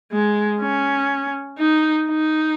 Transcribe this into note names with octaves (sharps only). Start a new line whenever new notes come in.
G#3
C#4
D#4
D#4